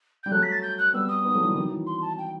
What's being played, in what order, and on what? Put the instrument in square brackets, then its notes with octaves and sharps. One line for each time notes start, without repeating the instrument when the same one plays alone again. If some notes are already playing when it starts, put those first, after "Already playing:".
[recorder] G6
[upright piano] G3
[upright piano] F#3 A3 [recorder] F#6
[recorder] B6
A6
G6
F#6
[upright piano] G3 B3 [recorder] E6
[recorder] D#6
[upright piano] B3 D#4
F#3 A3
E3 G3
D#3 F#3
E3
[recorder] C6
A5
G5